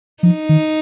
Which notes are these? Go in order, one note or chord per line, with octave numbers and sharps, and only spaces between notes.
F3 D#4
D#3